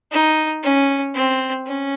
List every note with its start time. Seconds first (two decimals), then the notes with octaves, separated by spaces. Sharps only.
0.11 D#4
0.63 C#4
1.15 C4
1.66 C#4